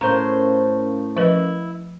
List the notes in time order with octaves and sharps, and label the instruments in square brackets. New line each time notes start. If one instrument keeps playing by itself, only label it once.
[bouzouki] A2 C5 [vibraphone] C#4 A#4 F5 [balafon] A#5
[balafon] F3 B4 D#5 [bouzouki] E4